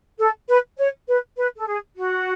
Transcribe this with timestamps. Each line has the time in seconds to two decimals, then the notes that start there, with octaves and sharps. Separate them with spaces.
0.19 A4
0.48 B4
0.78 C#5
1.08 B4
1.37 B4
1.57 A4
1.67 G#4
1.97 F#4